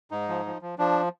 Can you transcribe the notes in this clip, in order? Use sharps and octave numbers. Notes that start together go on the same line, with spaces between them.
G#2 D#4
F3
F3
F3
F3 D4